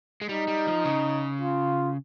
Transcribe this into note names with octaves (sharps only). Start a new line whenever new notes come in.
G#3
G3 D#4
G3
F3
C#3
F4